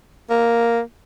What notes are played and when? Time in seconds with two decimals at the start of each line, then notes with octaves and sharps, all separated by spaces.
0.30 A#3